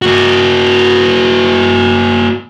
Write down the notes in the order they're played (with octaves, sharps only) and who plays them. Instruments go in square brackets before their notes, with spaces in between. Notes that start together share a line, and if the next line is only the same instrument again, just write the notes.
[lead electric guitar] A#3 F#4